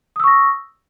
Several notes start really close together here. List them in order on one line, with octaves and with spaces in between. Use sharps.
D#6 E6 C#6 A#6